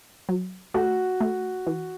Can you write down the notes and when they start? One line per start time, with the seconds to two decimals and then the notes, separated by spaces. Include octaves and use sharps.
0.29 F#3
0.74 A3 F#4
1.21 A3
1.66 E3